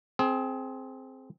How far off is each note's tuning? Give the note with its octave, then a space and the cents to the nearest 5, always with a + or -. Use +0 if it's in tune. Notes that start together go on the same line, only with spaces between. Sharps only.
C4 +0 G#4 +30